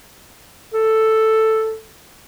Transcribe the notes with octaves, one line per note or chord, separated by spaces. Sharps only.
A4